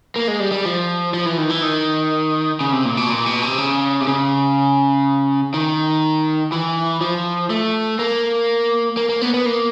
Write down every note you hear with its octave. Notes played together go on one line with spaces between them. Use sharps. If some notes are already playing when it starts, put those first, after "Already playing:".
A#3
G#3
G3
G3
F3
F3
E3
D#3
E3
D#3
C#3
C3
A#2
B2
A#2
B2
C3
C#3
C3
C#3
D#3
E3
F3
A3
A#3
A#3
A#3
B3
B3
A#3